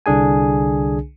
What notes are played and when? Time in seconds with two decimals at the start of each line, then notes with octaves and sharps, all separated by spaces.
0.06 C2 D3 D4 G#4 G#5